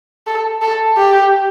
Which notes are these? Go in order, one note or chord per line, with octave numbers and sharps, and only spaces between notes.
A4
A4
G4